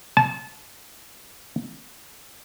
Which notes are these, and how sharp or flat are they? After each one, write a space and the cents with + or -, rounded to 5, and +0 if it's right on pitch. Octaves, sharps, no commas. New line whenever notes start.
A5 -25